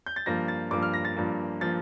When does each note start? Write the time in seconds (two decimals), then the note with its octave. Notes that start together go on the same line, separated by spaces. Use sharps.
0.06 G6
0.16 A6
0.26 G2 F3 A#3 A#6
0.48 A6
0.71 G2 F3 A#3 D6
0.83 F6
0.94 A#6
1.05 A6
1.17 G2 F3 A#3
1.61 F3 A#3 A6